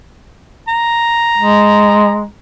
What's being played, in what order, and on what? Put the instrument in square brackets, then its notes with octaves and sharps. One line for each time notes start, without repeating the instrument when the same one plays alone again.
[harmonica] A#5
[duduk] G#3